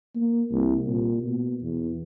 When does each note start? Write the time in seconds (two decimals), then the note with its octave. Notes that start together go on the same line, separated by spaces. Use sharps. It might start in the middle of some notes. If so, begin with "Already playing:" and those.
0.15 A#3
0.52 C2
0.87 A#2
1.22 B2
1.62 E2